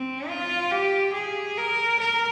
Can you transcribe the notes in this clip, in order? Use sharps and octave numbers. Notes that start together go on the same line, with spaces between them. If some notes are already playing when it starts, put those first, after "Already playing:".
Already playing: C4
F4
G4
G#4
A#4
A#4